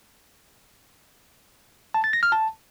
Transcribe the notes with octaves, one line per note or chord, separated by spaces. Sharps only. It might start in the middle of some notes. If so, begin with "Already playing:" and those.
A5
A6
A#6
F6
A5